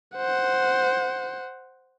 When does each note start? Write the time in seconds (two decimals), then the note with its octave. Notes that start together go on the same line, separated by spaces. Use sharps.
0.17 C5 F#5